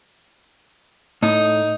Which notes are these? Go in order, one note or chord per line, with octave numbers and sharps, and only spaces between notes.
A2 D#4